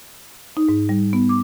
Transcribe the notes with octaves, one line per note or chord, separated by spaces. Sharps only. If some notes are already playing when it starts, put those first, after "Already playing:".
D#4
G#2
G3
B3
D6